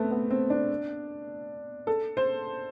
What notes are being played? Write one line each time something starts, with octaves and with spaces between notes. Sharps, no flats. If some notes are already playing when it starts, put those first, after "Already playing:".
Already playing: A3 B3 C4
B3
C4
D4
A4
C5